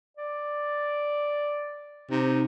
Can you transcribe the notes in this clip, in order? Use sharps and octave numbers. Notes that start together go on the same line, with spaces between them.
D5
C3 D#4